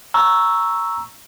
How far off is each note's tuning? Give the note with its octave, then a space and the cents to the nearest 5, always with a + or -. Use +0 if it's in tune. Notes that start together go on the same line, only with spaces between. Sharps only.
A#5 +0 C#6 +0 E6 +0